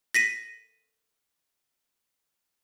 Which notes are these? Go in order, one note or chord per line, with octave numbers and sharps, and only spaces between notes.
A#6 B6 D#7